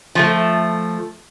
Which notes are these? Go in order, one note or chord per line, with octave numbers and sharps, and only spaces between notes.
F3 A3